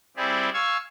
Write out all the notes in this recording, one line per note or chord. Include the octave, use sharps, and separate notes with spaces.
G3 C4 E4 G4 G#4 D5
F5 G#5 C#6 E6 G#6